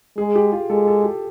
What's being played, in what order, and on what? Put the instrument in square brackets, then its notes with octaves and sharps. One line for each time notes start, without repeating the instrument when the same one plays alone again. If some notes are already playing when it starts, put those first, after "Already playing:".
[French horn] G#3 [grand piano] G#4
[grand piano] G4
F4
[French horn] G#3 [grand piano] A4
[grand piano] A4
G4